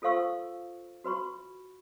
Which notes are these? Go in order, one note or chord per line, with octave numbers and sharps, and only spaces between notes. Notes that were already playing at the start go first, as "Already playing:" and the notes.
F4 A4 C5 F5 C#6 E6
F#4 B4 B5 C#6